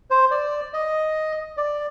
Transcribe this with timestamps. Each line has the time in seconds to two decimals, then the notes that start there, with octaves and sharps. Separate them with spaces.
0.10 C5
0.31 D5
0.73 D#5
1.57 D5